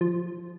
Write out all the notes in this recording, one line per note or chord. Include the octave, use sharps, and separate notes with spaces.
F3